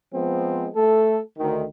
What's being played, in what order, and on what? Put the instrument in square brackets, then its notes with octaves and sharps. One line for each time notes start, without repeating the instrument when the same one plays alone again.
[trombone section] F3 G#3 B3 C4
A3 A4
D2 D#3